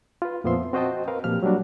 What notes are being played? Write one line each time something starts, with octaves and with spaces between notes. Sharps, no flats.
F4 B4
F2 A#2 F3 B3 E5 C6
C4 F#4 C5 D#5 G5 A5
C4 A#4 B4 F5
A#2 F3 G4 F6
F#3 G3 A#3 D4 F#4